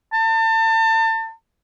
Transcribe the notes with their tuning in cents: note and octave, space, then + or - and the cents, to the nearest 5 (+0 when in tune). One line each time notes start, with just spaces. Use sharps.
A5 +35